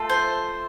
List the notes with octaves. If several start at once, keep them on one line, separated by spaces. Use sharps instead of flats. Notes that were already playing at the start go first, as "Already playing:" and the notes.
Already playing: A3 F4 A4
C5